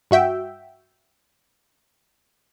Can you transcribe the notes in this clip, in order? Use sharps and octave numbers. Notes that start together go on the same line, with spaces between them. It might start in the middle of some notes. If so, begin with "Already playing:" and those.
G2 F#4 E5 G5